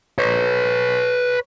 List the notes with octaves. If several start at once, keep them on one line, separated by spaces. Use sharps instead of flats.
B4 C#5